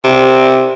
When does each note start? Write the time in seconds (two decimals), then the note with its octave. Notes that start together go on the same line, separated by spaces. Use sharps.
0.04 C3